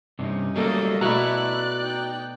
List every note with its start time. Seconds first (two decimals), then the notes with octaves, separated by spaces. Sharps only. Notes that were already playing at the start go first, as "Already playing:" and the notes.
0.19 G2 C3 C#4 D#4
0.56 F#3 G3 A3 A#3 A4 D#5
1.01 B2 A3 E4 F#4 D5 A#5 F#6
1.79 D#4 G5